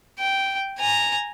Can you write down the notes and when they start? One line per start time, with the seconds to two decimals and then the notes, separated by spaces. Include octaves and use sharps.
0.19 G5
0.79 G#5 A#5